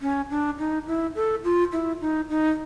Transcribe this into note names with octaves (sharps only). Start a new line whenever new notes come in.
C#4
D4
D#4
E4
A4
F4
E4
D#4
D#4